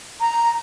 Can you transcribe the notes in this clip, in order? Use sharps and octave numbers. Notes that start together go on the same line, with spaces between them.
A#5